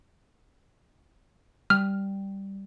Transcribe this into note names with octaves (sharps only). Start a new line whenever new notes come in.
G3 F6